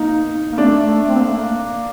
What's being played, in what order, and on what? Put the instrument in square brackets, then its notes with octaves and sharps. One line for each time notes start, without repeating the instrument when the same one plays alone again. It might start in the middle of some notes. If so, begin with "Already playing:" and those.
Already playing: [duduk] A#3 [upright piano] D#4
[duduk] A#3
[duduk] A3 [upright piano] D4
[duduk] A3
C4
A#3
A3
A#3